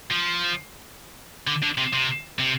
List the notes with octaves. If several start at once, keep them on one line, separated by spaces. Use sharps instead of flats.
F3
D3
D3
C3
C3
C3